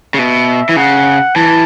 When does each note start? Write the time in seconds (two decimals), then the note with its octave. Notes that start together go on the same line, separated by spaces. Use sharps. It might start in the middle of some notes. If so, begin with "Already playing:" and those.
0.14 C#3
0.18 B2 E5
0.69 E3
0.76 C#3 F#5
1.36 E3 A5